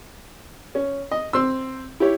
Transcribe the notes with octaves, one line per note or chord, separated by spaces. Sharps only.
C#4
D#5
C4 C6 E6
E4 G4 C#5